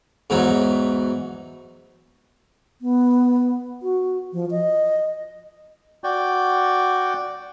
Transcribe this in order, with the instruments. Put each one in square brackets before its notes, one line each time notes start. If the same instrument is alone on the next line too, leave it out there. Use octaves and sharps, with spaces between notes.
[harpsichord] E2 G#2 F#3
[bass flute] B3
F#4
F3
D#5
[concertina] F#4 D5 G5